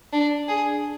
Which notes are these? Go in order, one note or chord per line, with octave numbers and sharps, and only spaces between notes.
D4
G#4